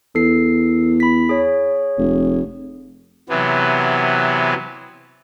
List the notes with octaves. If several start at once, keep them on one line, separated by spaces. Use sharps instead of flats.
E2 A4 C7
B5 B6
G#4 C#5
F1
C3 E3 F#3 B3